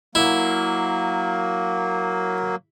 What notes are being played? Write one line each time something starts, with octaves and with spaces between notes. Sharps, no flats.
F#3 A#3 E4